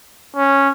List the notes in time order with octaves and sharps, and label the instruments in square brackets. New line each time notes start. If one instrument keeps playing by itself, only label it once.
[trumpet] C#4